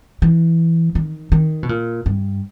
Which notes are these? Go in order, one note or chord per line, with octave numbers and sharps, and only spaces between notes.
E3
D#3
D#3
B2
A#2
G2